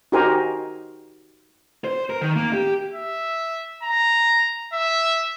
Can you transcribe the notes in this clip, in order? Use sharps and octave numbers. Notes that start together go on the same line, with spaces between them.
D#4 F#4 G4 A#4 C5 G#5
C5
A#4
D#3
A#3
G4
E5
A#5
E5